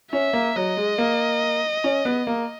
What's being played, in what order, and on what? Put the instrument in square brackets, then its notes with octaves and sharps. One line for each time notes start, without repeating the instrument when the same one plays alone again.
[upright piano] C#4 [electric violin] E5
[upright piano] A#3
[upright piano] F#3 [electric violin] D#5
[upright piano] G#3
A#3
C#4
B3
A#3